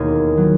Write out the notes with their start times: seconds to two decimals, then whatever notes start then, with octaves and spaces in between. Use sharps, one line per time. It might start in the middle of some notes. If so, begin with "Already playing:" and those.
Already playing: E1 D#2 D#3 G#4 A#4 C#5
0.37 D#3 F#3